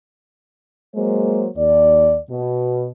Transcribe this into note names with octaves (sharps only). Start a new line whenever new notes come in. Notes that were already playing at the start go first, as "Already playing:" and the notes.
F#3 G#3 A#3 C5
D#2 D5
B2